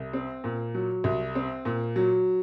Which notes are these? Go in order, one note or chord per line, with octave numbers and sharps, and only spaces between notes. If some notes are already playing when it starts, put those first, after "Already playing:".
Already playing: C2
C4
A#2
F#3
C2
C4
A#2
F#3